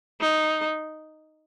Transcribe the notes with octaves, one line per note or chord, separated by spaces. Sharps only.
D#4